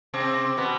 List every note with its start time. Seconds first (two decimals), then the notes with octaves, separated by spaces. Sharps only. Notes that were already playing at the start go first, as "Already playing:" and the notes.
0.14 C3 C4 D6
0.35 C6
0.57 B2 B3 B5